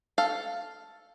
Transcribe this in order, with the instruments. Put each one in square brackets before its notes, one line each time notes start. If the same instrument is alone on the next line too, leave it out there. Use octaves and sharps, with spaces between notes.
[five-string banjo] A4 F5